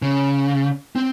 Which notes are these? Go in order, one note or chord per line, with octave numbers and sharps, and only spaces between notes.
C#3
C4